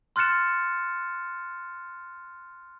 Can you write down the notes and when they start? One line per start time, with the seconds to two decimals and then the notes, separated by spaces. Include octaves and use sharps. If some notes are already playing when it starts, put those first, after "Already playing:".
0.16 C6 F6 F#6 A6 C#7 E7